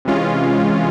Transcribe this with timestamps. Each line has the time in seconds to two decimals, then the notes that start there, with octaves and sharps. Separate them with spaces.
0.05 C3 E3 G#3 C#4 F4